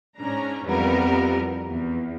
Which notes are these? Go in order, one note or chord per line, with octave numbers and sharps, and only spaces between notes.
G#2 C#4 D4 A#5
F2 E3 G3 B3 A#4
E2